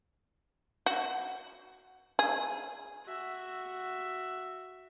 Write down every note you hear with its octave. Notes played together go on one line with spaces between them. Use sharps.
F#4
G#4
F#4 E5